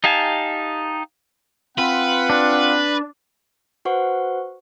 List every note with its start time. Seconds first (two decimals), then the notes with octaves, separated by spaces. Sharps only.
0.04 D#4 G4 F5 G#5 A5
1.78 C4 F4 B4 F#5
2.30 D4
3.85 F#4 B4 C5 F#5 C#6